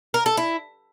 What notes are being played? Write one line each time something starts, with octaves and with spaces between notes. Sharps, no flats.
A#4
A4
E4